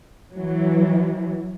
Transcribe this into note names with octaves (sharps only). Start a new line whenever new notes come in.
E3 F#3